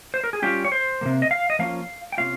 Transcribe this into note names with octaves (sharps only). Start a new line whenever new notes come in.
C5
A#4
G#4
G3 C#4 F4 G4
C#5
C5
C3 D#3 A#3
D#5
F5
D#5
F3 A#3 C#4 F4 F5
G5
C3 F3 A#3 C#4 F4 F5